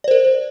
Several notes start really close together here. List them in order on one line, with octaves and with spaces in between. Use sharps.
D5 C5 A#4